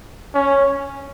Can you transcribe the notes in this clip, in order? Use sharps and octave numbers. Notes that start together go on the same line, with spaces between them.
C#4